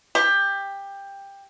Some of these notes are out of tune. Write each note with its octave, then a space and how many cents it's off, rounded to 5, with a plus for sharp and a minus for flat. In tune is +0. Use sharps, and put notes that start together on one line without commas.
G4 +15